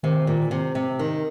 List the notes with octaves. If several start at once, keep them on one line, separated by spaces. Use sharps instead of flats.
C3 D#3
A#2
C3
C3
D#3